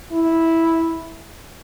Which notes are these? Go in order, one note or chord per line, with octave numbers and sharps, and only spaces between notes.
E4